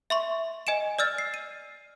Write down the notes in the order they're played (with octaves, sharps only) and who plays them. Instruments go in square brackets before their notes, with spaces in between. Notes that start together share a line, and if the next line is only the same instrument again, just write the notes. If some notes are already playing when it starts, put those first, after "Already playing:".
[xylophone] E5 C6 C#6
D#5 G#5 D7 E7
D5 E6 F6 A6
C7
D#7